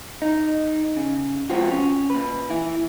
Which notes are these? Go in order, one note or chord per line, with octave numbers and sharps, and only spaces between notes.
D#4
C#3
F3 G#3 B3 C4 F4 F#4
C#4
A#2 B4
E3 E4